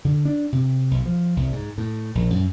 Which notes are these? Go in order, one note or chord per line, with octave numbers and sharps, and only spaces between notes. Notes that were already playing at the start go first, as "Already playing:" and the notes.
D3
D4
C3
B1
F3
C2
G#2
A2
A#1
F#2